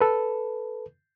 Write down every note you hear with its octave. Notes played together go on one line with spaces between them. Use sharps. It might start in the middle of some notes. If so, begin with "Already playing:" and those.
A4 B4